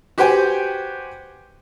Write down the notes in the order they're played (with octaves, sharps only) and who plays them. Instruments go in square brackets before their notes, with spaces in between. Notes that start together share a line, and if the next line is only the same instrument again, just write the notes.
[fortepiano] F#4 G4 B4 C5 G5 G#5